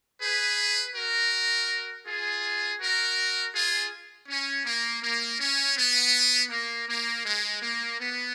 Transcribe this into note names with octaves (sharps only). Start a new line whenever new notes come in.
G#4 B4
F#4 A#4
F4 G#4
F#4 A#4
F4 G#4
C#4
A#3
A#3
C#4
B3
A#3
A#3
G#3
A#3
B3